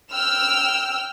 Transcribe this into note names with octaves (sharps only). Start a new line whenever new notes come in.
G5 E6 F6